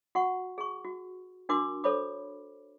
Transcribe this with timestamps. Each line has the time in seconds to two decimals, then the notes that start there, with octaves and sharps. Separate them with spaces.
0.15 F#4 F#5 C#6
0.58 G#4 C#6
0.84 F#4
1.49 D4 F#4 A#4 C6 D6
1.84 A4 C5 C#5 B5 D6